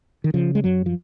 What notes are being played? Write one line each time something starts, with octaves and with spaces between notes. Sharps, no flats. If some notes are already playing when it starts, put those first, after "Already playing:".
D#3
C#3 F3
G#3
F#2 F#3
F3